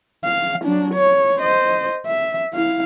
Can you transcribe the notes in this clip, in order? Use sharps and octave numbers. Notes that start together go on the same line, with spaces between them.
F5
F#3 D4
C#5
C5 D#5
E5
E4 F5